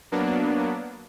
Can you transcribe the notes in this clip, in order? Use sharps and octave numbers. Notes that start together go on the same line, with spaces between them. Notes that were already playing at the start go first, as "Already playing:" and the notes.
F#3 A#3 B3 D4